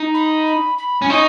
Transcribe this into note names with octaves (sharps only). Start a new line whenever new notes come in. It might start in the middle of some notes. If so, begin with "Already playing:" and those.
Already playing: D#4
B5
B5
B5
C#4
D#4 C#6